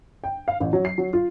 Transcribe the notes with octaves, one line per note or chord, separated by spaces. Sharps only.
G5
F5
A1
F#3
C7
F#3
F4